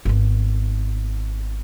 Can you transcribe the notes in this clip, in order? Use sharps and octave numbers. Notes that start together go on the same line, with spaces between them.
G#1 B3